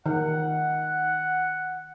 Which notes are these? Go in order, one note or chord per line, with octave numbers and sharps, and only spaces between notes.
D#3 F#5